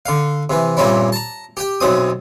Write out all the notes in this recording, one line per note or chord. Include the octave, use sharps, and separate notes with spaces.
D3 F5
C3 E3
G2 A#2 G3 C4 C#4 E4
A5 A#5
G4 G5
B1 F#2 F#3 C4 D#6